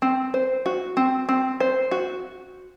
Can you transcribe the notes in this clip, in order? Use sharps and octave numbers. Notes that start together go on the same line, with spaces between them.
C4
C5
F#4
C4
C4
C5
F#4